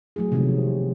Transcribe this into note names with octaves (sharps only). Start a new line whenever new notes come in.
F#3 A3 E4 G#4
C3 D#3 F3 F#3 G#3 B3
C5